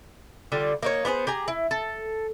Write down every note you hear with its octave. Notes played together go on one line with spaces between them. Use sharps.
D3 G3 F4
A#3 D#4 C#5
B3 D4 G#4 C5
G4 G#4 A#5
E4
A4